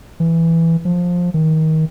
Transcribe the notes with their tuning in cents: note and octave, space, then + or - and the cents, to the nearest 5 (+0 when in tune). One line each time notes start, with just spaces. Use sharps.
E3 +5
F3 +15
D#3 +25